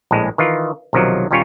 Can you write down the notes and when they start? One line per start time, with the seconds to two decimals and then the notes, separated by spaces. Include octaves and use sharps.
0.11 A#1 A2 G#3
0.38 D#3 E3 F4
0.93 B1 C3 D#3 F3 F#3
1.31 D#2 A#2 G3 C#4 F4 C#5